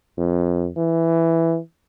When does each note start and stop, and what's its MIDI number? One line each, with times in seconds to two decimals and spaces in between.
0.18 0.68 41
0.77 1.58 52